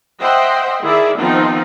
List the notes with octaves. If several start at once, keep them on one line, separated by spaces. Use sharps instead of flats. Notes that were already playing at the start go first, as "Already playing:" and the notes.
C5 D#5 E5 F#5 G5 C6
D#3 E4 G#4 D5 E5
D#3 F3 B3 C4 D#4 F4